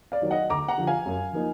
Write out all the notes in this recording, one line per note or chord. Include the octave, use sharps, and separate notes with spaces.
D5 F5
D#3 F#3
D#5 F#5
D2 A#5 D6
F#5 A#5
D3 F3
F5 G#5
F#2
F3 A#3 D#4